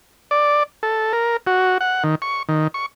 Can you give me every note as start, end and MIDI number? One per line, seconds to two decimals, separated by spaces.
0.31 0.63 74
0.83 1.13 69
1.13 1.37 70
1.47 1.78 66
1.81 2.03 78
2.04 2.15 51
2.22 2.43 85
2.49 2.68 51
2.74 2.86 85